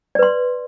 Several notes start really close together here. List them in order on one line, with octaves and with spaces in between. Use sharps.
D5 B4 C6